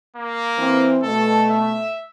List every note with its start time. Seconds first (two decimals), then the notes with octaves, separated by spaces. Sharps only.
0.17 A#3
0.58 E3 C4
1.03 B2 A3 A4
1.51 E5